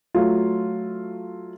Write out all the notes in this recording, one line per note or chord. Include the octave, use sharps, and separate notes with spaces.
F#3 A3 F4